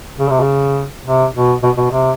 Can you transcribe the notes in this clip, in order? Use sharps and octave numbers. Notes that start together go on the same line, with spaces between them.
C#3
C3
C#3
C3
B2
B2
B2
C3